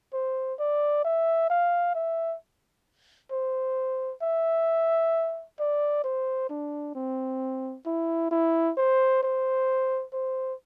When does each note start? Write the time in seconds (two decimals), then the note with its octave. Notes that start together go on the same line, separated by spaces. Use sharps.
0.13 C5
0.59 D5
1.04 E5
1.50 F5
1.95 E5
3.31 C5
4.22 E5
5.59 D5
6.04 C5
6.49 D4
6.95 C4
7.86 E4
8.31 E4
8.77 C5
9.22 C5
10.13 C5